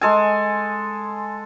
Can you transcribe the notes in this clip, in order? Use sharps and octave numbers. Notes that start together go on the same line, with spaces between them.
G#3 A4 G#5